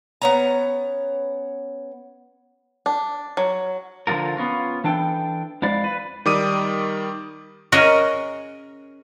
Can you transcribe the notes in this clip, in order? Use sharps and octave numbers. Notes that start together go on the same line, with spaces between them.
B3 C#4 A#5
D4
F#3
D3 F3 B3 F4 A#4
B3 C#4 F4
E3 D4 A4 G5
F2 G#3 E4 D5 F5
B4
D#3 G3 D6 D#6 D#7
C#4 F#4 G#4 A#4 D#5